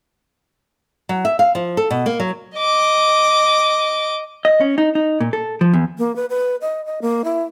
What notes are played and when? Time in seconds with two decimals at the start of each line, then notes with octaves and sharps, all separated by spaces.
1.09 F#3
1.25 E5
1.39 F5
1.55 F3
1.77 A4
1.91 B2
2.06 A#3
2.20 F#3
2.55 D#5 D6
4.45 D#5
4.61 C#4
4.78 D#4
4.95 D#4
5.20 A#2
5.33 A4
5.61 F3
5.73 E2
5.98 A#3
6.16 B4
6.30 B4
6.61 D#5
6.86 D#5
7.02 A#3
7.24 E4